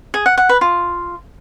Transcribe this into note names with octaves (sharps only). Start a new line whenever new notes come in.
G#4
F#5
F#5
B4
F4